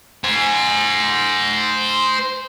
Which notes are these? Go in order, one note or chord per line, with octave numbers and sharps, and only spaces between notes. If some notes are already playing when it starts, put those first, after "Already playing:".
C5 G#5